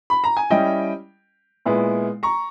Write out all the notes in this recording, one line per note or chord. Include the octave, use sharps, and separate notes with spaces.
B5
A#5
G#5
G3 C#4 E4 D#5 G5
A#2 G#3 B3 E4
A#5 C#6